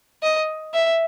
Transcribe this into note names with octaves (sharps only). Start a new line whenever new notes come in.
D#5
E5